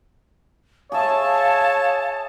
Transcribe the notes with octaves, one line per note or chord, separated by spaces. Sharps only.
G#4 C#5 E5 F5 A5